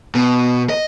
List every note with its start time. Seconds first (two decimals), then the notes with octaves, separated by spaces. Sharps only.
0.15 B2
0.70 D#5